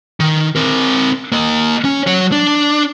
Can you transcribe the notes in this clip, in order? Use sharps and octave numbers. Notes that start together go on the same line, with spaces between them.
D#3
C4 A#4
A#3 D#5
C#4
F#3 C#5
D4